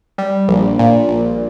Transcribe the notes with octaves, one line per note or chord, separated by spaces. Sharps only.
G3
A#1
A#2
A#1